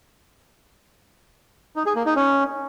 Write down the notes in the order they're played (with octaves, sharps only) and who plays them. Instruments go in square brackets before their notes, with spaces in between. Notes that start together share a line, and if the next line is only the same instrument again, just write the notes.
[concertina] D#4
G#4
A#3
D#4
C#4